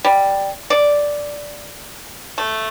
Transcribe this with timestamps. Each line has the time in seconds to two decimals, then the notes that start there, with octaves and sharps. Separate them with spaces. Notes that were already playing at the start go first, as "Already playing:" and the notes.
0.04 G3
0.70 D5
2.38 A3